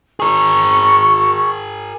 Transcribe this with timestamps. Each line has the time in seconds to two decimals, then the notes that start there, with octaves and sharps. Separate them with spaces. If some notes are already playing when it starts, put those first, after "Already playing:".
0.20 G#4 A#4 C#6